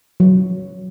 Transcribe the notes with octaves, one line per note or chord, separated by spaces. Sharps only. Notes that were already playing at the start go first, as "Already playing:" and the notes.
F#3